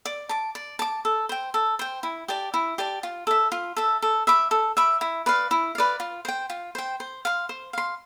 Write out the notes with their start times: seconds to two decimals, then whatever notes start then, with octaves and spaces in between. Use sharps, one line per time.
0.05 D5
0.29 A5 D6
0.55 D5
0.79 A5 D6
1.05 A4
1.29 C5 G5
1.54 A4
1.79 C5 G5
2.03 E4
2.28 G4 D5 A5
2.54 E4
2.78 G4 D5 A5
3.03 F4
3.27 A4 E5
3.52 F4
3.76 A4 E5
4.02 A4
4.27 E5 B5 D6
4.51 A4
4.77 E5 B5 D6
5.01 E4
5.26 B4 D5 F5
5.51 E4
5.75 B4 D5 F5
6.00 F4
6.25 C5 G5
6.50 F4
6.75 C5 G5
7.00 C5
7.25 F5 C6
7.49 C5
7.73 F5 C6